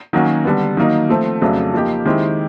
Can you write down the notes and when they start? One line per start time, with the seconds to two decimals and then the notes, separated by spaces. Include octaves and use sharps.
0.13 D#3 F#3 A#3 C#4 F#4
0.45 D3 G3 B3
0.77 D#3 F#3 A#3 D#4
1.09 F3 A3 C4
1.41 F2 C#3 F#3 A3 D4
1.74 F3 A#3 D#4 G4
2.05 D#3 G#3 C4 E4 G4